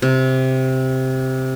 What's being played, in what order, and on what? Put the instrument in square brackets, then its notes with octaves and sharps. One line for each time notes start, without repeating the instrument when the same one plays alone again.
[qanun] C3